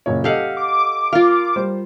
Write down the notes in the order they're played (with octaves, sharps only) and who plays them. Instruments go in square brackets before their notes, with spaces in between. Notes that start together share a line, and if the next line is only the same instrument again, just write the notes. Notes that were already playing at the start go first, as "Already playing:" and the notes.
[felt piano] F#1 A#2 C#5
[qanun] G4 F5 F#5 [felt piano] A4 D#5
[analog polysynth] D6
[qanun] F4 A#4 [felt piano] F5
[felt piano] G3 C5